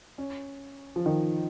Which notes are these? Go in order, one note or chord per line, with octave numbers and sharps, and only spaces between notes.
C#4
F3
D#3